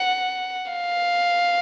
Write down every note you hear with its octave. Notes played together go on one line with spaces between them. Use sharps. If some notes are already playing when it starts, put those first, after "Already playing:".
Already playing: F#5
F5